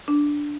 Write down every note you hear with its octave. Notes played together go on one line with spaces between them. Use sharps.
D4